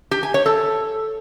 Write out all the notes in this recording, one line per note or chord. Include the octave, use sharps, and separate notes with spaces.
G4
G#5
C#5
A4